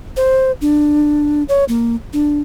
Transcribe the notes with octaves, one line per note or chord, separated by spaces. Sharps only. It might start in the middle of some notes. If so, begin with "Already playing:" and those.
C5
D4
C#5
A#3
D4